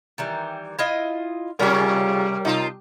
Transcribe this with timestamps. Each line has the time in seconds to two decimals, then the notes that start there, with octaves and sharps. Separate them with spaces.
0.18 D#3 E3 G3
0.79 E4 F4 D#5
1.59 C3 G3 G#3 C#4 F4 A#4
2.45 C3 D#4 F4 A5